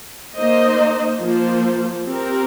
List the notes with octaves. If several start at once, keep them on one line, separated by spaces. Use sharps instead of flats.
A#3 D#4 C5 D#5
F3 A#3 F4 C5
C4 G4 A#4